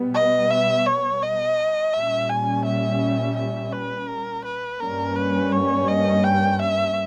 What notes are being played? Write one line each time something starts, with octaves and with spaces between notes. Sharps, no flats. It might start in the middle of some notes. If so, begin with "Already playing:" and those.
Already playing: B2 G3 B3
D#5
E5
C#5
D#5
A#2 G3 C#4 E5
G#5
E5
E5
B4
A#4
B4
G2 G3 A#3 C#4 A#4
B4
C#5
D#5
G5
E5